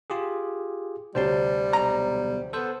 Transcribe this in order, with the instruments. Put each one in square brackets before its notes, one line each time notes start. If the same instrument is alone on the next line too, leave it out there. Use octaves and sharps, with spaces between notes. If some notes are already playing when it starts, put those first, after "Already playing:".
[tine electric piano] F4 G4 G#4
[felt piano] D2 C3 C#5 [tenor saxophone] G3 [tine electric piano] C5 A5 C6
[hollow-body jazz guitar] B1 A#5
[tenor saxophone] B3 [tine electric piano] A4 C5